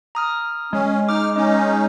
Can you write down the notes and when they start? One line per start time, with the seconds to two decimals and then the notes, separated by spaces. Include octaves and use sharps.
0.15 A#5 D#6 F6
0.73 G#3 C#4
1.09 D#4 D6 F6
1.36 C#4 D#4 D#5